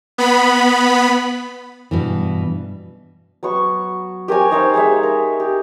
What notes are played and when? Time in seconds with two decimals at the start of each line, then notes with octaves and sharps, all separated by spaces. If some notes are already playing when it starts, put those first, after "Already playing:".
0.18 B3 B5
1.91 G2 B2 E3
3.43 F#3 B3 C#6
4.28 G4 A#4 C#5 G#5
4.51 D#4 C5 C#5 F5
4.74 G#3 D#4 C#5 E5
5.03 A#4
5.40 G4